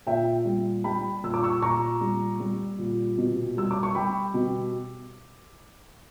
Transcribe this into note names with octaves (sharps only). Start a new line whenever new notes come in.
A#2 E5 G5
G3
G3 G5 B5
A#2 E6
D6
C#6 E6
A#2 A#5 C#6
G3
G3
A#2
B2
G3 E6
D6
C#6
G3 G5 B5
B2